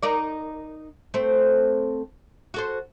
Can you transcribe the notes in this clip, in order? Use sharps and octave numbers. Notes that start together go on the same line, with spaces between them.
D#4 A#4 D5
A3 C4
F#4 A4 C5